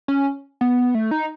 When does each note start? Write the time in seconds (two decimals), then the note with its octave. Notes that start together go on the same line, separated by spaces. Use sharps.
0.08 C#4
0.61 B3
0.95 A3
1.11 D#4